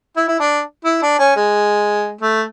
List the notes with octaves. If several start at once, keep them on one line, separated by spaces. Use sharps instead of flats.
E4
E4
D4
E4
D4
C#4
G#3
A3